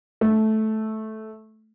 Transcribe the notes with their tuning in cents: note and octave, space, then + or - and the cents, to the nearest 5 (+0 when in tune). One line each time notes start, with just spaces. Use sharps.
A3 -10